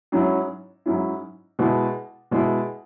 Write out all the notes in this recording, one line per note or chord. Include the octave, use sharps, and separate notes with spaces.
G#2 F#3 C#4 E4
G#2 F#3 C#4 E4
B2 G#3 E4
B2 G#3 E4